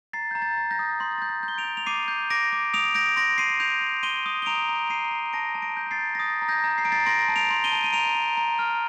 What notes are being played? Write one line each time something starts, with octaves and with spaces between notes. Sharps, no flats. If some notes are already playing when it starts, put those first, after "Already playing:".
A#5 A6 C7
A#5 G6
A6
A#5
G6 A#6
D#6
C6 G6
G6 A6
G6
G6
G7
D7 F7
G6
F7
D6 C7 D#7
G6
D6 A#6 D7
D6
D#6 D7 F7
G6 A#6 D7
C6 A#6 D7
C6 C7 D#7
G6 D7 F7
C6
C6 D#7 G7
D#6
G7
A#5 D7 F7
A#5
A#5 C7 D#7
A#5
A5 A#6 D7
A5
A#6 D7
G6
A#6
A6 C7
G6
A#6
D#6 A6
A#5
G6 A#6
A#5
C7
A#5 D7
A6 C7
C6 A#6 D7
A5
D7 F7
C6
D#7 G7
A5
D#7
A#5 D7 F7
A#5
A#5
F6